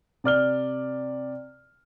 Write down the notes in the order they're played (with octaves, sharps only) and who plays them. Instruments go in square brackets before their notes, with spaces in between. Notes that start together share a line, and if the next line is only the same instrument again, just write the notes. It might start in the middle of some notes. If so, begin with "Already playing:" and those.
[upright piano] C3 D5 F6 G7